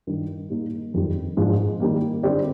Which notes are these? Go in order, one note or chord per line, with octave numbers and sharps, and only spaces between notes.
G2 D#3 G3
G3 A#3 D#4
F2 D#3 G3
G#2 F3 G#3 D4
D#3 G3 A#3
D3 G3 C4 G4 D5